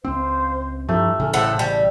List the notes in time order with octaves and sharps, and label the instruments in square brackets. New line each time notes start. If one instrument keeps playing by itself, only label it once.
[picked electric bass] C#2 C4 [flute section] C5 F5
[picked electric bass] G2 F3 [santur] A3 [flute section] E4 G4 A#5
[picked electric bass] A1 C#3 [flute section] A4 G#5 F6
[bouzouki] A2 A4 F#5 [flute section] C5 F5 A5
[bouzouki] G3